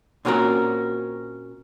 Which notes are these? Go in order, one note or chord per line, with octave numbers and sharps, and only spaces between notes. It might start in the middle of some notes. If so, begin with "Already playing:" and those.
A#2 C4 C#4 F#4 G#4 A#4